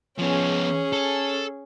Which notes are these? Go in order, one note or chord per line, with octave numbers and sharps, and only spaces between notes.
F3 B3 C#4 G#4
A4